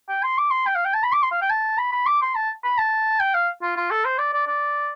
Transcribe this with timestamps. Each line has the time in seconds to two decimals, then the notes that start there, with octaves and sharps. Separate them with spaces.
0.09 G5
0.23 C6
0.38 D6
0.51 C6
0.66 G5
0.75 F5
0.85 G5
0.94 A5
1.04 B5
1.13 D6
1.23 C6
1.31 F5
1.42 G5
1.50 A5
1.78 B5
1.92 B5
2.06 D6
2.22 C6
2.35 A5
2.64 B5
2.78 A5
3.20 G5
3.34 F5
3.62 F4
3.76 F4
3.91 A4
4.05 C5
4.19 D5
4.33 D5
4.47 D5